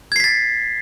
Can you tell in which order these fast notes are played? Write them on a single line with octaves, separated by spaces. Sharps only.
G#6 C7 B6 A6